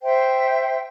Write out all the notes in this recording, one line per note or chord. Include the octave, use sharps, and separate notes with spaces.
C5 E5 G5